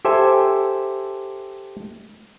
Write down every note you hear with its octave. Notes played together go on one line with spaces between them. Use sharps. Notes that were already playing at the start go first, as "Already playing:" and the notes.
G4 A4 C5 E5 G#5